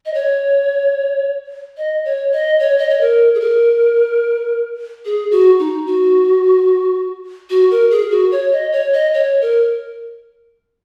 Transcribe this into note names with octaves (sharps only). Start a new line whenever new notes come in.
D#5
C#5
D#5
C#5
D#5
C#5
D#5
C#5
A#4
G#4
A#4
G#4
F#4
D#4
F#4
F#4
A#4
G#4
F#4
C#5
D#5
C#5
D#5
C#5
A#4